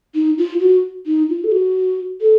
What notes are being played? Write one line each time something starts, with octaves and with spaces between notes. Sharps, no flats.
D#4
F4
F#4
D#4
F4
A4
F#4
A4